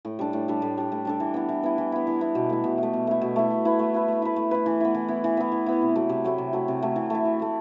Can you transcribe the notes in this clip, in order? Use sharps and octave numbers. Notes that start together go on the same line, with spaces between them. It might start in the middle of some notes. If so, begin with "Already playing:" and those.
A2
G3 D4 A4
A2
G3 D4 A4
A2
G3 D4 A4
A2
G3 D4 A4
E3
B3 E4
E3
B3 E4
E3
B3 E4
E3
B3 E4
B2
A3 E4
B2
A3 E4
B2
A3 E4
B2
A3 E4
A3
E4 B4
A3
E4 B4
A3
E4 B4
A3
E4 B4
E3
B3 E4
E3
B3 E4
E3
B3 E4
E3
B3 E4
C3
F#3 A3 E4
C3
F#3 A3 E4
C3
F#3 A3 E4
C3
F#3 A3 E4
E3
A3 E4
E3
A3 E4